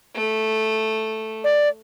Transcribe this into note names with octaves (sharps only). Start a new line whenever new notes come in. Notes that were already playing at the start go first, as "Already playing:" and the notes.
A3
D5